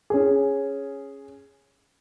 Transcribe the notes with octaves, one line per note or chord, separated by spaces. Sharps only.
C#4 G#4